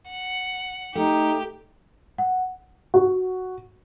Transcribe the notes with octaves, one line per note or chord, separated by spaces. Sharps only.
F#5
A3 D#4 G4
F#5
F#4